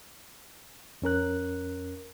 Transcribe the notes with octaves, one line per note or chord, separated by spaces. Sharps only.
F2 C#4 A#4 F#6